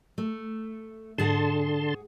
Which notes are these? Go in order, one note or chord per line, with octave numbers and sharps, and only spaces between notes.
A3
G#2 D3 G#4 F#5 A5 C6